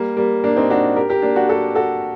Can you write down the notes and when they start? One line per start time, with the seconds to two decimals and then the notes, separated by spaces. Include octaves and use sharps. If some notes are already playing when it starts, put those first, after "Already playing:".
Already playing: G3 A#3
0.17 G3 A#3
0.44 A#3 D4
0.56 C4 D#4
0.70 D4 F#4
0.96 G4 A#4
1.09 G4 A#4
1.22 A#3 D4
1.36 D4 F#4
1.49 F#4 A4
1.75 F#4 A4